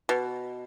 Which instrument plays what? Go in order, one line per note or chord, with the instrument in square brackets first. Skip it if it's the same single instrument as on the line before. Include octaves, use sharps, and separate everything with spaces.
[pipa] B2